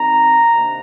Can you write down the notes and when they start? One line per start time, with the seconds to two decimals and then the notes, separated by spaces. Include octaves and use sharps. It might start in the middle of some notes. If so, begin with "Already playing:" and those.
Already playing: D#3 G3 C4 D#4 A#5
0.54 C3 D#3 A#3 D4